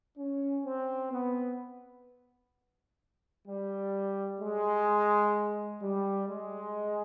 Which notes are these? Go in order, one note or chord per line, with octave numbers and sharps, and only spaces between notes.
C#4
C4
B3
G3
G#3
G3
G#3